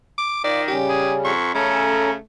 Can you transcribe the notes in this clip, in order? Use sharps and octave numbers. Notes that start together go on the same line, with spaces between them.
D6
D#3 F4 D5
C#3 G3 C#4 G4
G#4
F2 C#6
C#3 A3 C#4 A4 A#5